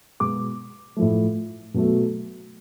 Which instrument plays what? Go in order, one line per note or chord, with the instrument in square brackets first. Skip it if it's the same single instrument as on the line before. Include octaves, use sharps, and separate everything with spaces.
[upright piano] B2 G#3 B3 D6
A2 F3 A3
B2 F#3 A3